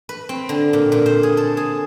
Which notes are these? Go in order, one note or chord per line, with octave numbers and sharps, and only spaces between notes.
B4
C4
D3
A#2
A#2
C5
G#4
A4
G#4